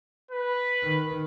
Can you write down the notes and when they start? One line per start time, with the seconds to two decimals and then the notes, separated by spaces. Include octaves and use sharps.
0.31 B4
0.83 D#3